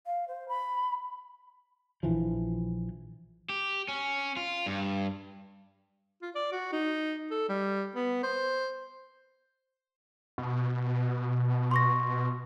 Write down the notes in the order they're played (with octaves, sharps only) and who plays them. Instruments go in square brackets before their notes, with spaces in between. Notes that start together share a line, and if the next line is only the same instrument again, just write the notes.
[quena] F5
C5
B5
[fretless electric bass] A#1 E3 F3
[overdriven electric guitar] G4
C#4
F4
G2
[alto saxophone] F4
D5
F#4
D#4
A4
G3
B3
C5
[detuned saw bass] B2
[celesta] C6 C#6 A#6